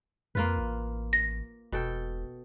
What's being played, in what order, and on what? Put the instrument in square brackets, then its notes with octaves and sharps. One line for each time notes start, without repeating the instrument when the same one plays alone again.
[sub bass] F2 [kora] A#3 F4 B4
[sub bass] A1
[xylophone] A#6
[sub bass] E1 [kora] B2 A4 G5